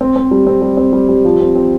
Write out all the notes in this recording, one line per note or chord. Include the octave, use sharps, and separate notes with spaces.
C4
C4
G3
C4
G3
C4
G3
G3
F3
C4
C4